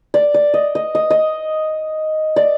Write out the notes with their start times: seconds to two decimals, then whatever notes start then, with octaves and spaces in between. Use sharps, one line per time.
0.14 D5
0.34 D5
0.54 D#5
0.75 D#5
0.95 D#5
1.10 D#5
2.36 D5